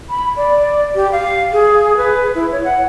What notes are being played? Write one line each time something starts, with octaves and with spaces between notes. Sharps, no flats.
B5
D5
G4
F5
G#4
B4
E4
C#5
F#5